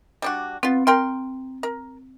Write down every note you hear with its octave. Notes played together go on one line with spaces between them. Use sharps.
G3 D4 F#4
B3 C4 F4
A#4 G5 C6 F6
A#4